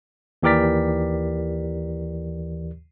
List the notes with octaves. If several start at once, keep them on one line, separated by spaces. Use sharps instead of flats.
D#2 E3 G4 A#4 D5 B6